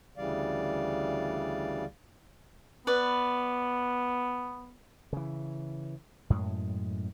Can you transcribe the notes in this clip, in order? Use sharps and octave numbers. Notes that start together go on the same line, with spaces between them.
D2 C#3 E3 G3 D5 F5
B3 B4 D5
C#3 E3
F#2 A2 G#3